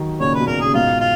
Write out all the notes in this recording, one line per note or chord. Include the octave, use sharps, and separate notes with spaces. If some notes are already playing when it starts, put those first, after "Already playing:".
Already playing: D#3 F#3
A#2 C#3 C#5
B4
B2
A#2 C#3 A#4
C#3 G#4
G#2 B2 F4
F4